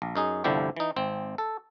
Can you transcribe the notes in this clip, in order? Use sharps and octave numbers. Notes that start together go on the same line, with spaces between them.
A#1
F#2 D#4 G#4
G1 C2 D3 F3 E4 G4
E3 D#4
G#1 C4
A4